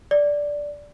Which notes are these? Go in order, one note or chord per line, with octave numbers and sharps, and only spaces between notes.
D5